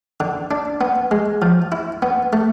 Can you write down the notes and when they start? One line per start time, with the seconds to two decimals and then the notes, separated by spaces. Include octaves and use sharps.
0.20 D3
0.51 D4
0.81 B3
1.11 G#3
1.42 F3
1.72 E4
2.02 B3
2.33 A3